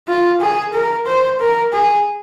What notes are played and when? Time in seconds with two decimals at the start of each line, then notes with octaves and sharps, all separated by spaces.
0.08 F4
0.41 G#4
0.73 A#4
1.06 C5
1.40 A#4
1.73 G#4